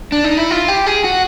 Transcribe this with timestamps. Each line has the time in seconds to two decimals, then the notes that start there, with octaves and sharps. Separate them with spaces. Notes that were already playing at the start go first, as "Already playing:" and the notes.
0.12 D4
0.24 D#4
0.37 E4
0.51 F4
0.68 G4
0.86 G#4
1.04 F#4